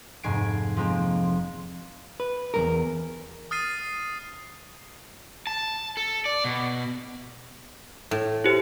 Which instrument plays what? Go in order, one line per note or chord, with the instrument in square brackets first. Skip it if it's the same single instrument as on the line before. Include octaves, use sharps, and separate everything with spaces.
[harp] F1 G#2 G#5 C7 D7
F3 G#3 A#3 C4
[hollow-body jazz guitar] B4
E2 G2 A#4
[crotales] D#6 F6 A6 C7 D#7
[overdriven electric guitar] A5
A4
D5
B2
[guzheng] A2
[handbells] E4 G4 C5